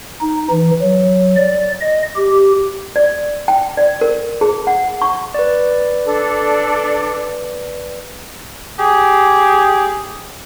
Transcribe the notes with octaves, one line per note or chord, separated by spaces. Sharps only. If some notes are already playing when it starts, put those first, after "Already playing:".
D#4
E3
F#3
D5
D#5
G4
D5
G5
D5
A#4
G#4
F#5
C#6
B4 D5
D4 A4
G4 G#4